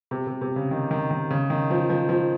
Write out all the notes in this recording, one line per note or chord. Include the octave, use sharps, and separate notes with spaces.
C3
C3
C3
C#3
D#3
D#3
D#3
C#3
D#3
F3
F3
F3